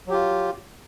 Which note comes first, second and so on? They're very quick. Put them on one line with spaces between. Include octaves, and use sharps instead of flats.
F#3 G4 F4